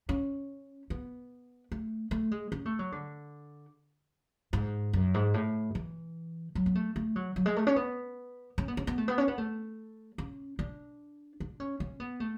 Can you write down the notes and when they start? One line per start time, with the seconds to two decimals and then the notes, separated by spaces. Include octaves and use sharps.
0.09 C#4
0.90 B3
1.72 A3
2.11 A3
2.31 G#3
2.52 C#4
2.65 A3
2.79 F#3
2.92 D3
4.53 G#2
4.93 F#2
5.14 G#2
5.34 A2
5.75 E3
6.55 F#3
6.66 B3
6.75 A3
6.96 A3
7.16 F#3
7.36 F#3
7.46 G#3
7.56 A3
7.67 C#4
7.76 B3
8.58 C#4
8.68 B3
8.77 C#4
8.87 B3
8.98 A3
9.08 B3
9.18 C#4
9.28 B3
9.38 A3
10.18 C#4
10.59 D4
11.40 D4
11.60 C#4
11.80 C#4
12.00 B3
12.20 A3